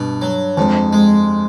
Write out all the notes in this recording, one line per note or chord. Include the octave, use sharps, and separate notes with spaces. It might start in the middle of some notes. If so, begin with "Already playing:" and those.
Already playing: G2 B2
F#3
F2 G#2
G#3